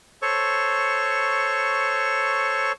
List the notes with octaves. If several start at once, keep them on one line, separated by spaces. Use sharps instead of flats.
A4 C5 C#5 C#6